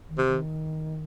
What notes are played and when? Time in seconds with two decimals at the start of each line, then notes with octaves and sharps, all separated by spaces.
0.09 D#3
0.18 C3
0.27 D#3